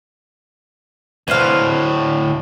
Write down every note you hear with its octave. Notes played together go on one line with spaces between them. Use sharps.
D2 A2 B4 C5 F5